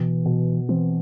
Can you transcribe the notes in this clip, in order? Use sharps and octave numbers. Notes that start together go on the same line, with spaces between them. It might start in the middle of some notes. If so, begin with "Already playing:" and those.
Already playing: B2 E3
B2
E3 C4